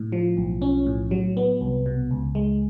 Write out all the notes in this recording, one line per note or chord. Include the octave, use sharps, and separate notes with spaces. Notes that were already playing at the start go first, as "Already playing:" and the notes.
Already playing: A2
F3
B1
C#4
A2
F#3
B3
C2
B2
C#2
G#3